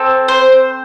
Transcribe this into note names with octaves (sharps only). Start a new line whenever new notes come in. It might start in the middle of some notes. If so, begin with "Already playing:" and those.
Already playing: C4 A4
C5